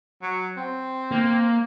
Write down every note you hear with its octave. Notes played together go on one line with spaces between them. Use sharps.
F#3
C4
A#3